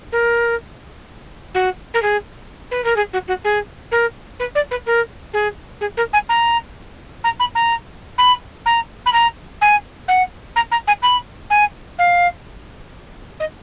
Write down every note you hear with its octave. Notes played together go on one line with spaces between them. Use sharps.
A#4
F#4
A#4
G#4
B4
A#4
G#4
F#4
F#4
G#4
A#4
B4
D5
B4
A#4
G#4
G#4
A#4
G#5
A#5
A#5
B5
A#5
B5
A#5
B5
A#5
G#5
F#5
A#5
A#5
G#5
B5
G#5
F5
D#5